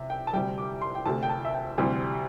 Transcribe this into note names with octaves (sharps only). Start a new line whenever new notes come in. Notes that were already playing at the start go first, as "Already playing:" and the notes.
Already playing: C3 E5
G5
A5
D2 C3 G3 G5
D6
C6
G5
D2 C3 A3 A5
G5
A5
E5
G5
D2 C3 E3 G3 C4